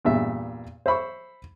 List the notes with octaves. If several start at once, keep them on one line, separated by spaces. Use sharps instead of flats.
E2 G2 A#2 E5
C5 E5 B5 C#6